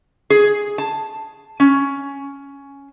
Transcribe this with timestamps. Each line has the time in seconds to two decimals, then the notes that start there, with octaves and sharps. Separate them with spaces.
0.30 G#4
0.78 A5
1.60 C#4